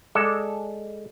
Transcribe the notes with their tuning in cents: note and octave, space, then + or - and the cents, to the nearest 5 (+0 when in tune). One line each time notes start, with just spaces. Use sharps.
G#3 +0 A4 +0 D5 +0